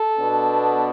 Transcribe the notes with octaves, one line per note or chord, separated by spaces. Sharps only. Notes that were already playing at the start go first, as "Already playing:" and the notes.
Already playing: A4
B2 B3 D4